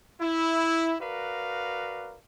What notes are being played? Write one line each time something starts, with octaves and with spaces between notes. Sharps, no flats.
E4
F#4 A#4 B4 D5 F5